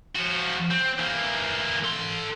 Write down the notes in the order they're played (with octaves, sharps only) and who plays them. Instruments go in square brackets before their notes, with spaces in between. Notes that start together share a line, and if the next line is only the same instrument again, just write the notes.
[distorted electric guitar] F3 F#4
C4
E3 A#3
A4 C6